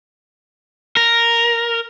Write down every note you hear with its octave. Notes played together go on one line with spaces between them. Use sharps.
A#4